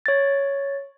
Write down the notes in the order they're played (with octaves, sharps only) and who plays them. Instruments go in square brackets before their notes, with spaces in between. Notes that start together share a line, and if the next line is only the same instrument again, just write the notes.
[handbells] C#5 A6